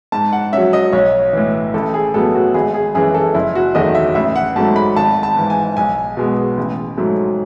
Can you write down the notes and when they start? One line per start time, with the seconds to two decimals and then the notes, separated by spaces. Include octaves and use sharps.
0.12 G#2 A5
0.33 F#5
0.53 F#3 C#4 E5
0.73 D#5
0.93 B1 C#5
1.33 A2 E3
1.74 A1 A4
1.94 G#4
2.14 A2 F#3 B3 A4
2.35 F#4
2.54 G#1 G#4
2.74 G#4
2.95 F#2 E3 G#4
3.14 A4
3.35 F#1 E4
3.55 F#4
3.75 E2 D#3 F#3 A3 D#5
3.95 E5
4.15 A1 E5
4.36 F#5
4.56 G#2 F#3 A3 A5
4.76 B5
4.96 G#1 A5
5.23 A5
5.36 G#2 E3
5.50 G#5
5.77 B1 G#5
6.17 B2 G#3 B3
6.57 A1
6.98 G#2 F#3 A3